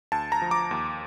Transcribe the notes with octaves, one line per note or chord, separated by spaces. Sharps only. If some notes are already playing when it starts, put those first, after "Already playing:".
D2 A5
A#5
F3
D6
D#2